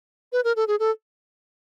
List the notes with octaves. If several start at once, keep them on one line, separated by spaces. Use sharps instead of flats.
B4
A#4
A4
G#4
A4